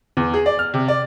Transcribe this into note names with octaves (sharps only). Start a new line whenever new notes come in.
E2
G#4
D5
F6
C3
D5